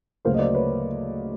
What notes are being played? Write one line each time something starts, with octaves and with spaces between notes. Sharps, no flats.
D2 C#3 F#3 A#3 A#4 C5
D#5
C5 D5
B4 C#5